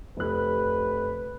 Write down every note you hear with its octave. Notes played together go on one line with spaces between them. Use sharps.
F1 B4 F#6